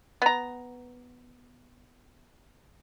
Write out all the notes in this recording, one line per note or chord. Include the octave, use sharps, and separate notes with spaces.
B3 A#5